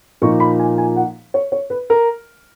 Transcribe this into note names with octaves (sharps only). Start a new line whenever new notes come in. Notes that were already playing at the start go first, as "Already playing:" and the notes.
A#2 F3 A#3 D#4 C#6
B5
G#5
G#5
F#5
C#5
C#5
B4
A#4